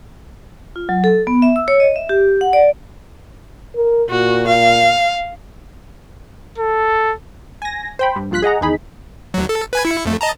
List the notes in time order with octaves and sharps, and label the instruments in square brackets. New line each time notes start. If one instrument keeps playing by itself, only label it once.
[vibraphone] F4
F#3
A4
B3
E5
E6
C#5
D#5
E5
G4
F#5
D5
[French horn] A#4
[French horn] A#2 [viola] F#4
[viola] F5
[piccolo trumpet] A4
[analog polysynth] G#5 A#6
C5 G5 B5
G2
A#1 G2 F4 F#6 B6
G#4 D#5 F#5 A#5
E2 D#3 D#4 G#4 B5
[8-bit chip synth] D2 F#3
A4
B4 G#5 G#6
E4 C#7
F2 A3
D#5 A5 A#5